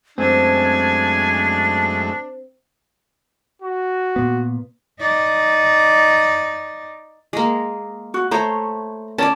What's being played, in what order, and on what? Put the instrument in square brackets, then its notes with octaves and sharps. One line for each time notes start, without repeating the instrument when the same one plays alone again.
[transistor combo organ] F#2 G#3 A3 [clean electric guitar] C4 [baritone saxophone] D4 [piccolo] G#5
[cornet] F#4
[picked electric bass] A#2 B3
[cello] D#4 D5
[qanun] G#3 A#3
[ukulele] F#4
[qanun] A3 C5 C#5 [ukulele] A#5
[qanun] C#4 D5 [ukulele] C#5 A5